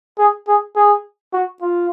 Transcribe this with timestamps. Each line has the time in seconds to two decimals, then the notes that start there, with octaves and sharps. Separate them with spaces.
0.19 G#4
0.48 G#4
0.76 G#4
1.33 F#4
1.62 F4